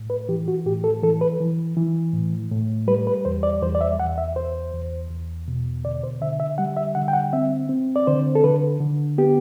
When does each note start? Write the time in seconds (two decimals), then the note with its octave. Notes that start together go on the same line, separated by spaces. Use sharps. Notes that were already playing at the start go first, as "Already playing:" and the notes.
Already playing: A2
0.10 B4
0.29 E3 G4
0.48 F#4
0.66 A2 G4
0.84 A4
1.03 E3 A4
1.21 B4
1.40 E3
1.77 E3
2.13 A2
2.51 A2
2.87 G3 B4
3.07 B4
3.25 E2 C5
3.43 D5
3.62 E2 C5
3.75 D5
3.81 E5
3.99 E2 F#5
4.18 E5
4.36 E2 C5
4.74 E2
5.10 E2
5.48 B2
5.84 D3 D5
6.03 C5
6.22 D3 E5
6.40 E5
6.58 G3 F#5
6.77 E5
6.95 D3 F#5
7.08 G5
7.13 F#5
7.33 C4 E5
7.69 C4
7.96 D5
8.07 D3 C5
8.35 A4
8.44 D3 B4
8.80 D3
9.18 B3 G4